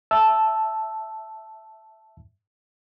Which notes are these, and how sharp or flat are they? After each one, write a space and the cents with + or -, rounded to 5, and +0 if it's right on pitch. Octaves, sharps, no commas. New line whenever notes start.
E5 +0 A5 -5 E6 +0